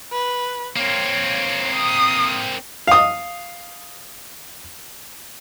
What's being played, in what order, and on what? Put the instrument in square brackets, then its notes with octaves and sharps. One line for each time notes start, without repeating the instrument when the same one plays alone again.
[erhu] B4
[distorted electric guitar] A#3 C4 [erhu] C#5
[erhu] D#6
[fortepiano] F5 D#6